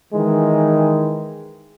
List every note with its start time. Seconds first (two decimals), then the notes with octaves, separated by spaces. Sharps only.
0.14 D#3 E3 G#3